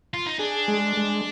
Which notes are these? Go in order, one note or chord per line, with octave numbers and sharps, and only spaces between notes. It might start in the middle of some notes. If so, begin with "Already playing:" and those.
F4
D#4
D4 G#4
G#3
G#3